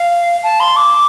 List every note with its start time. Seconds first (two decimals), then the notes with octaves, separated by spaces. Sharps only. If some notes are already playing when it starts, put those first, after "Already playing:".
Already playing: F5
0.43 A5
0.60 C6
0.76 D6